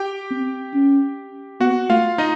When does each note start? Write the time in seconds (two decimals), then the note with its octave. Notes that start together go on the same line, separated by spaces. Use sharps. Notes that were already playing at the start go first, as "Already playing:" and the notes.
Already playing: G4 G5
0.30 C4
0.74 C#4
1.60 B3 F#4 F#5
1.90 A3 F4 F5
2.18 D#4 D#5